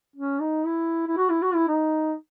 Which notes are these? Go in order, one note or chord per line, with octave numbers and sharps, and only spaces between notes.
C#4
D#4
E4
E4
F#4
E4
F#4
E4
D#4